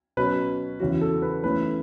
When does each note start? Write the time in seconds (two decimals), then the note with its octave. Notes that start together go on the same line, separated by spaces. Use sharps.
0.17 B2 F#3 C#4 B4
0.80 E2 C#3 E3 C#4 F#4
1.01 A4
1.22 B4
1.43 E2 E3 A3 C#4 B4